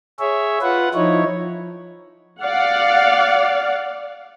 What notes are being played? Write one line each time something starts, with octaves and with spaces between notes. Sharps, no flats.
G#4 C#5 E5
F4 B4 F#5
F3 D#4 E4 C#5
D5 F5 F#5